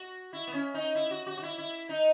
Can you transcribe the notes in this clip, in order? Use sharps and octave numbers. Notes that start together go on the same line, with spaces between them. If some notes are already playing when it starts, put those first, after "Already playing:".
Already playing: F#4
E4
B3
C#4
D#4
E4
F#4
F#4
F#4
E4
E4
D#4